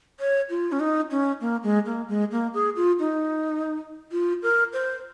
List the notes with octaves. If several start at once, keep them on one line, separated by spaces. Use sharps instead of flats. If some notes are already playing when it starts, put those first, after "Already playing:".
C#5
F4
C#4
D#4
C#4
A#3
G#3
A#3
G#3
A#3
G#4
F4
D#4
F4
A#4
C5